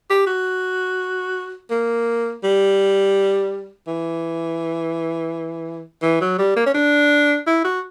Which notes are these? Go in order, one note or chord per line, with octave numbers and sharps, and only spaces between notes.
G4
F#4
A#3
G3
E3
E3
F#3
G3
A#3
C#4
D4
E4
F#4